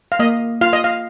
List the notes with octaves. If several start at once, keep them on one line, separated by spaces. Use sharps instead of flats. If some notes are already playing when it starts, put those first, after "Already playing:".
F5
A#3 D#5
F4 F5
D#5
F5